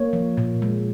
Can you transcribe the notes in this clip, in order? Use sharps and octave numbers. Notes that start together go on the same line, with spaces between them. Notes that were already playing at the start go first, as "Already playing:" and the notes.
Already playing: A#3 C#5
F3
A#2
G#3